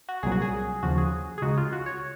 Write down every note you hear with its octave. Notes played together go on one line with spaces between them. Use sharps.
F#4
C2 A#2 F#3 G#4
F#4
G#4
D#2 C#3 F3 F#4
G#4
G#4
C#2 C#3 G#3 D#4 F#4
F4
F#4
C#5